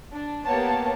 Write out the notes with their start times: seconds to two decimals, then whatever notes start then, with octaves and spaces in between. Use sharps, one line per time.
0.14 D4
0.46 A#3 B3 G4 C#5 A5